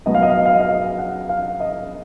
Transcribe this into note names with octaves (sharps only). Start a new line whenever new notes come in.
B2 F#3 B3 D#5
F5
D#5
F5
D#5
F5
D#5
F5
D#5
F#5
F5
D#5